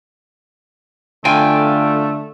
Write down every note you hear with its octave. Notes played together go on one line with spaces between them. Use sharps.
D3 A3 F4 G5 G#5